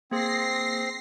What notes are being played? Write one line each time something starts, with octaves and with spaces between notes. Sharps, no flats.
A#3 C4 G#4 A6 A#6 C7